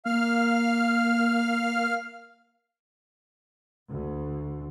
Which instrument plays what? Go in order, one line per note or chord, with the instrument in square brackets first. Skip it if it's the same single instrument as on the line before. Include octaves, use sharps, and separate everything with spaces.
[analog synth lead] A#3 [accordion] F5 F6
[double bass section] D2